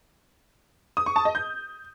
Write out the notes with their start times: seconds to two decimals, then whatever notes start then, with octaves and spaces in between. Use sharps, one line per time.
0.97 D#6
1.06 C#6
1.16 A5
1.25 D#5
1.35 G6